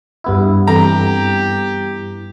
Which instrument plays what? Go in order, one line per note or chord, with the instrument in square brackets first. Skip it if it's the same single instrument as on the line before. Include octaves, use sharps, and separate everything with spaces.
[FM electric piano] G2 B3 E4
[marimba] E3 C4 A4 [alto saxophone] G4 [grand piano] A#5